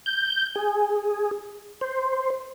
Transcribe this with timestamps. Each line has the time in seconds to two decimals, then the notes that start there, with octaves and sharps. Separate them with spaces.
0.06 G6
0.56 G#4
1.81 C5